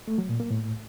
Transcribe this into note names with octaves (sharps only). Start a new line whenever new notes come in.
A3
F#3
A#2
A#3
A2